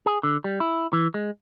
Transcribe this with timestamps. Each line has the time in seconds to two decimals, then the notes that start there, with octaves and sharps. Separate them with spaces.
0.06 G#4
0.23 D3
0.44 G3
0.60 E4
0.93 E3
1.14 G#3